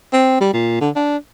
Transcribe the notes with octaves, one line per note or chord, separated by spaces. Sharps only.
C4
G3
A#2
D3
D4